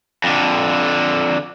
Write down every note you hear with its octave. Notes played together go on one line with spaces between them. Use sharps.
F2 D3